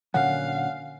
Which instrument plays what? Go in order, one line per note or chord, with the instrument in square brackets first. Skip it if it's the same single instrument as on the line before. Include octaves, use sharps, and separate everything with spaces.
[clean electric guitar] A#2 D3 F#3 [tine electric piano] C#4 [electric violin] F5 [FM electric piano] F#5